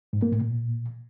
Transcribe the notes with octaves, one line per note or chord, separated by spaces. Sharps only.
G#2
A#3
A2
A#2